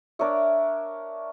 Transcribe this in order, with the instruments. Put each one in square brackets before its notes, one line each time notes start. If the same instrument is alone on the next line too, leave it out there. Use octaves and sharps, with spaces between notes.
[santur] D4 A#4 C#5 E5